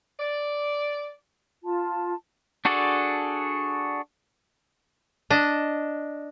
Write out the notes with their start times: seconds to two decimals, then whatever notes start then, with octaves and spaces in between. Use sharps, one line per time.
0.19 D5
1.65 F4 A5
2.65 D4 F#4 G#4 A4 D5
5.30 D4 D#5